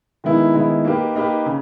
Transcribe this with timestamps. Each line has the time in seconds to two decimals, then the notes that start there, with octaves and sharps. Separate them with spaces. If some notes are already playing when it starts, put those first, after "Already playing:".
0.24 D#3 G#3 B3 E4
0.54 D#3 G#3 B3 E4
0.85 A#3 D#4 G4 B4
1.15 A#3 D#4 G4 B4
1.46 C#3